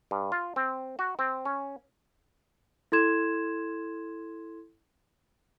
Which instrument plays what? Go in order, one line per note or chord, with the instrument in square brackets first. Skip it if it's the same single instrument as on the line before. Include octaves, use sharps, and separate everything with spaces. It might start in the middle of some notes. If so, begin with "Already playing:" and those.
[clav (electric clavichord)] G2
F4
C4
F#4
C4
C#4
[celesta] E4 A4 C6 G#6 E7